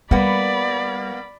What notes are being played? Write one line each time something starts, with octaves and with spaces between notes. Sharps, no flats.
G3 A#3 B3 D5 B5